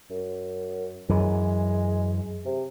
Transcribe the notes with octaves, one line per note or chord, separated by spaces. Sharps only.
F#2
F#2 E3 G#3
C3